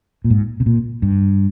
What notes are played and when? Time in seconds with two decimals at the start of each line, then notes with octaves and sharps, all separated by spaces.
0.24 A#2
0.30 G#2
0.60 C3
0.66 A#2
1.02 G2